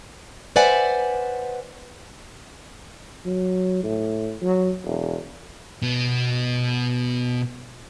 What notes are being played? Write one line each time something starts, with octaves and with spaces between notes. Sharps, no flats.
B4 C5 D5 E5 F#5 G#5
F#3
A2
F#3
E1
B2 B3